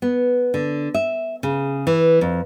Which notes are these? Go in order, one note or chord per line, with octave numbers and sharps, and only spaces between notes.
B3
D3
E5
C#3
E3
F2